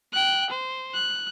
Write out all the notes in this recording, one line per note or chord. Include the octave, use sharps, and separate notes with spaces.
G5 F#6
C5
F#6